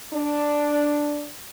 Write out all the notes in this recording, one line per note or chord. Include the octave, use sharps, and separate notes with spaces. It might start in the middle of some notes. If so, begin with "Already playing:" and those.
D4